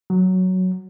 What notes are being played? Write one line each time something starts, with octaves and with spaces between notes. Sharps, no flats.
F#3